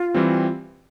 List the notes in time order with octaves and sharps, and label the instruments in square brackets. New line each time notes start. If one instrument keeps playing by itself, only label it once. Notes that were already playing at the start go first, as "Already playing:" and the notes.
Already playing: [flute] F4
[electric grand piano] E3 G3 C4